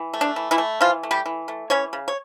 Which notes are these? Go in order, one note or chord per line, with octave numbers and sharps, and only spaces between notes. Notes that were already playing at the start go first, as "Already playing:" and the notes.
Already playing: E3
A3
D4
E3
E3 E4
A3
E3 F3 F4
A3
G3 G4
E3
A3
E3 C#4 C#5
C#3
C#5